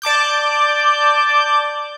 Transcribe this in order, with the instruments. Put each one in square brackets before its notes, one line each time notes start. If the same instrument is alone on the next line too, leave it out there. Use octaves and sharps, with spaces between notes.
[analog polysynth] D5 A5 D6 G6